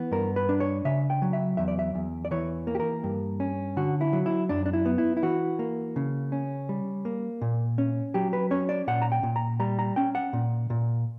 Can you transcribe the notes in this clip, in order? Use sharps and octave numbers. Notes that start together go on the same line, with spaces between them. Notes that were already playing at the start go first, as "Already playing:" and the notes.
Already playing: E3 B3
G2 A#4
B4
D4
C#5
C#3 E5
G5
F#3
E5
E2 E5
D5
E5
E2
D5
E3 C#5
A#3
G4
A#4
G2
C#4
D3 F#4
E4
F#3
E4
F#2 D4
D4
E4
B3
E4
E4
E3 F#4
A#3
C#3
C#4
G3
A#3
A#2
C#4
F#3 G4
B4
C#4 C#5
D5
A#2 F#5
A#5
G5
A#2
A#5
G3 A#5
A#5
C#4 G5
F#5
A#2
A#2